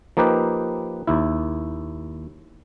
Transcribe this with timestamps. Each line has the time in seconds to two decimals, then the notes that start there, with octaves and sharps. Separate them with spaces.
0.17 F3 A#3 D#4 G4 B4
1.07 D#2 E4